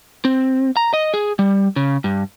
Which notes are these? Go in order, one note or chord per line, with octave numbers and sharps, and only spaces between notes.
C4
A#5
D#5
G#4
G3
C#3
G2